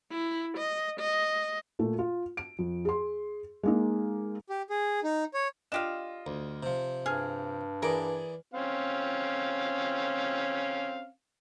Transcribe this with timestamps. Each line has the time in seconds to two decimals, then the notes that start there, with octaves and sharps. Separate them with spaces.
0.11 E4
0.57 D#5
1.00 D#5
1.79 A#2 A3
1.99 F4
2.37 D7
2.59 F2
2.85 G#4 C6
3.63 G#3 A#3 D#4
4.49 G4
4.70 G#4
5.03 D#4
5.34 C#5
5.72 D4 F4 G4 D#5 F5 E7
6.27 D2
6.63 C3 F3
7.06 G2 G#4 F6
7.82 E3 G#4 A#4 D5
8.54 C4 C#4 F5